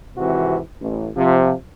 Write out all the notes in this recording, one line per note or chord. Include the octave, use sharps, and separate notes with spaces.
G#1 C3 E3 F#4
A1
C3 F3